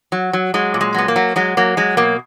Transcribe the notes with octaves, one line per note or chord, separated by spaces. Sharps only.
F#3
F#3
F#3 G#3
A#2
G#3
F#3 B3
A#3
F#3
F#3 G#3
F#3 A#3
F#3 G#3
B2 A#3